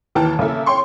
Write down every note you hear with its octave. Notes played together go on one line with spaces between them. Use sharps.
D#2 E3 G5 A5 F6
C#3 A#3 E4 A4
C#5 G5 C6 C#6